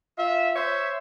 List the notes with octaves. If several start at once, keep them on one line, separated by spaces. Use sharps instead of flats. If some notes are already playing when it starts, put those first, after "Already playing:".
F4 E5
C5 C#5 E5